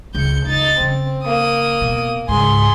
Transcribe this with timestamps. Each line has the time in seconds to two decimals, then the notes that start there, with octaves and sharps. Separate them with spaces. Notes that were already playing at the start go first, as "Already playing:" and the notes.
0.15 C#2 G6 C#7
0.46 C#2 D#4 A6
0.80 C#3 C4
1.25 A#3 D#6
1.81 B2
2.29 C#2 G#2 G#4 C6